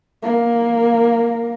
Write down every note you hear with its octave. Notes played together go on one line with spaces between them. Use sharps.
A#3